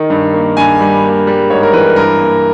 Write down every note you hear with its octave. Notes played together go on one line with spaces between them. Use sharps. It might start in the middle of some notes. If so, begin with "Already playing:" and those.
Already playing: D#3
G2
A#3
G2 G#5
G3
A#3
G3
G#2 C#5
A#4
E3 B4
G2 A#4
A#3